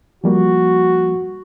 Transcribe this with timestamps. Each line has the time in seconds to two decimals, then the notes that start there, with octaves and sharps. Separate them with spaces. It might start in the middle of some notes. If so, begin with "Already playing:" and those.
0.24 F3 G3 A#3 F#4